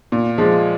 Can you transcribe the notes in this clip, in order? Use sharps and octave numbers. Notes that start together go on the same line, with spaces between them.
A#2
F3 G#3